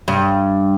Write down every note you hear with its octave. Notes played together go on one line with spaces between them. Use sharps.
G2